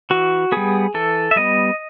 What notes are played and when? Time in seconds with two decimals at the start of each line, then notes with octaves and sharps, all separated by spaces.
0.10 E3 F#4
0.52 G3 B3 G#4
0.94 E3 A4
1.31 E5
1.36 G3 B3 D#5